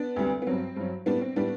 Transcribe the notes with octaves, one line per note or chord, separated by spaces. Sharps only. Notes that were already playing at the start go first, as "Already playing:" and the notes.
Already playing: B3 D4
D2 C3 G3
B3
G2 F#3 C4
G2 F#3
A2 G3 B3 D4
C4
A2 G3 B3 D4